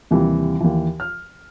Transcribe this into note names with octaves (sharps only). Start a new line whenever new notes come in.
D#2 C3 E3 G3
D#2 E3
F6